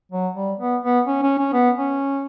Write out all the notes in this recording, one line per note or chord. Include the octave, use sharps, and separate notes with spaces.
F#3
G3
B3
B3
C#4
C#4
C#4
B3
C#4